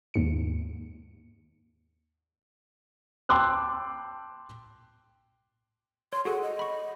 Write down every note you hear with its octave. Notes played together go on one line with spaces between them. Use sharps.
D#2 G#2 C#7
G5 A5 C6 D6 E6 F#6
C#5 C6
F#4 G#4 A4 F#5
D#5
B5 C#6